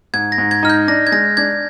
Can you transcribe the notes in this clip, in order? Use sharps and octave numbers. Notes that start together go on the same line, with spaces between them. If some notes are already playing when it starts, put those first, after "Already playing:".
G#2 G#6
A#6
G#2
G#6
D#4 F6
G6
D4 A#6
G#6
G#3 A#6
D4 G#6